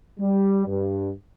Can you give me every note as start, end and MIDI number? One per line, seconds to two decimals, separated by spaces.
0.19 0.63 55
0.66 1.09 43